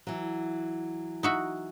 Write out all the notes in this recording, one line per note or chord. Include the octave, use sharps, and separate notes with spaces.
E3 F#3
D#4 F#4 E5